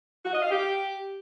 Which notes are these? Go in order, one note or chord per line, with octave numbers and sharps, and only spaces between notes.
F#4
D#5
F5
G4